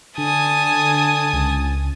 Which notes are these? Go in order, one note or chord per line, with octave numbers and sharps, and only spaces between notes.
D3 G#5 A5 D#6
C#2